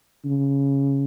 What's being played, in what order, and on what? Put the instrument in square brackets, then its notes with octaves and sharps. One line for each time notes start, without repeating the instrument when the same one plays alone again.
[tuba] C#3